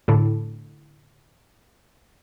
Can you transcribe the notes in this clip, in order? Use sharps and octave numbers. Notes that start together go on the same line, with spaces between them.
A2 D3